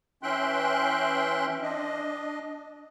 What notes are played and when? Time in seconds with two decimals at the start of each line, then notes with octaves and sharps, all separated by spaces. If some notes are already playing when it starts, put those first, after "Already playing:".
0.23 E3 C#4 E5 G5 C6 F#6
1.62 D4 D#5